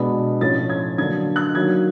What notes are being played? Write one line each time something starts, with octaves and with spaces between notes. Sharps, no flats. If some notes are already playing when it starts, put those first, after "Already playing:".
Already playing: B2 G#3 B3 D4
A2 F3 A3 C#4 A6
G#6
D3 F#3 A#3 D4 G#6
F#6
D#3 F#3 A#3 G#6